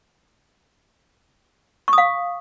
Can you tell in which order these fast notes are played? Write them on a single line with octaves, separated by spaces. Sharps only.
C#6 D#6 F5